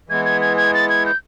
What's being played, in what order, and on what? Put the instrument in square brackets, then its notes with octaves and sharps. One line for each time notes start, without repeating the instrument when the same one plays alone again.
[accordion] E3 G#3 B3 [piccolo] G#6
[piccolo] G#6
G#6
G#6
A6
G#6
G6